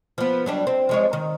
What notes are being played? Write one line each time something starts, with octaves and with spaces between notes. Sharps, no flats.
F3 B3
F#3 G3 D4
C4
F3 G#3 C#5
D#3